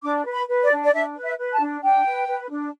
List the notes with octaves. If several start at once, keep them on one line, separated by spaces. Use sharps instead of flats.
D4 D6
B4
B5
B4
D5
D4
D5
D4 E5
B4
E5
B4
A5
D4
D4 G5
B4
B4
D4